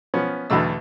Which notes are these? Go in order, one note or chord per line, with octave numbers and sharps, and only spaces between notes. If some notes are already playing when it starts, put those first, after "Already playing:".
F3 B3 C#4
B1 E2 B2 D3 A3 E6